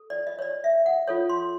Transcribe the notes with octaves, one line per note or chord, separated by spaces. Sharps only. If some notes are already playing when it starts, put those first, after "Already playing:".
Already playing: A4
D5
D#5
C#5
D5
E5
F#5
F4 A4 C#5
C6